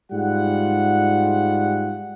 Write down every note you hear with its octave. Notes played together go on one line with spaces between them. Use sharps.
G#2 G3 F4 F#5